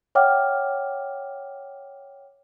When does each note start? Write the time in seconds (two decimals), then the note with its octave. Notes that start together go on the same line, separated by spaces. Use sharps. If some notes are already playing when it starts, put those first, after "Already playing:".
0.15 C#5 E5 F#5 G5 D6 F6